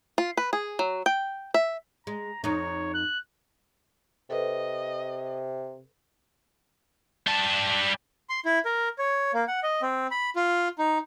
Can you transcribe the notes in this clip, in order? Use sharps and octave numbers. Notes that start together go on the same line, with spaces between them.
F4
B4
G#4
F#3
G5
E5
G#3 A#5
F2 D#4 C#5
F#6
C3 A4 B4 C5 D#5
G3 A5
C6
E4
A#4
C#5
A#3
F#5
D#5
C4
B5
F4
D#4